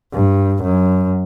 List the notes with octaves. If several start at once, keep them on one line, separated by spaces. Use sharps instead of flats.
G2
F#2